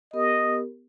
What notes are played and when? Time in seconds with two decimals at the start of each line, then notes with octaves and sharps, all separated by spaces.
0.13 B3 G4 A#4 D#5